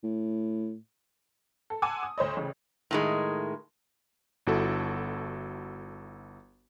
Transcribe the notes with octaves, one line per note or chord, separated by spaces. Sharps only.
A2
A4
F#5 G#5 A5 C6 D6 E6
D#6
D2 C5 C#5 D#5
A1 C#3
A2 D#3 G#3
G1 E4 F#4 A4